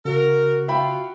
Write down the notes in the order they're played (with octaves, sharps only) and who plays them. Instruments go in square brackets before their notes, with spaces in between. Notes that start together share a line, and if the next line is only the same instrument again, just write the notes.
[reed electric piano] C#3 [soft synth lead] F#4 [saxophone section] A#4
[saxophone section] F4 [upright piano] E5 G5 B5